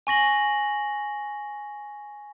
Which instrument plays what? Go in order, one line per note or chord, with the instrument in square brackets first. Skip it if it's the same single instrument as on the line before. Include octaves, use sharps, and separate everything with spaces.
[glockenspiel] G#5 C#6 A#6 F#7